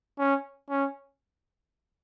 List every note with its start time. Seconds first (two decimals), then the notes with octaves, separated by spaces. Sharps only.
0.19 C#4
0.70 C#4